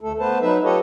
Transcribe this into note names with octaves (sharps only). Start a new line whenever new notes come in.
D2 A3 A4
A3 B3 B4 C5 A5
F#3 D#4 B4 E5
F4 G4 A4 B4 C#5 D#5